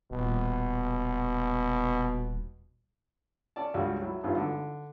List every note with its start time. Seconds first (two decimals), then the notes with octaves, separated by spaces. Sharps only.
0.11 D#1 B2
3.56 C#4 D5 A5
3.74 C#2 G2 F#4
4.02 F#3 E4
4.24 G#1 G2 F#3 F4 B4
4.37 D3